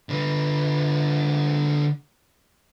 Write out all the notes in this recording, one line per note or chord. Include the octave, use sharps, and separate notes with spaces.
D3 B4